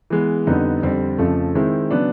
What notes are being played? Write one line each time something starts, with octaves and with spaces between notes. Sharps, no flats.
E3 G#3 B3
F2 D3 G3 B3 D#4
F2 D3 G3 C4
F2 C#3 F3 A3
D#3 G#3 C4 E4
C#3 F#3 B3 D4